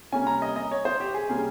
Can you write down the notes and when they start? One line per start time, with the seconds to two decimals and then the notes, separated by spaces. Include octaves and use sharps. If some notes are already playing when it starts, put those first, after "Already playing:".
0.12 C3 G3 A#3 C#4 G#5
0.27 A#5
0.42 D#5
0.56 D#5
0.71 C#5
0.85 C5
1.00 G4
1.14 G#4
1.29 C3 G3 A#3 C#4 G#4